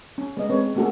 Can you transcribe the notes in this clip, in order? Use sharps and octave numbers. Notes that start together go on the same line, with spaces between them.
C#4
G#3 B3 D#5
G#3 C4 C#4 B4 C#5
A3 A#3 C#4 F#4 G#4 A4